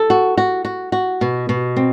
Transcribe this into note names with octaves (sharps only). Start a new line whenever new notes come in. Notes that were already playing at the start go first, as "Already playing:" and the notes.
Already playing: A4
F#4
F#4
F#4
F#4
B2
B2
C4